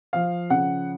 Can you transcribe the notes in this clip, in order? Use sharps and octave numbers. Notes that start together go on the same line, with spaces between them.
F3 F5
C#3 F#5